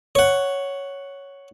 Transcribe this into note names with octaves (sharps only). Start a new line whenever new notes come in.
C#5 F#5